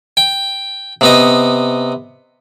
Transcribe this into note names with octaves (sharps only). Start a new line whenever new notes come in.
G5
C3 B3 D#5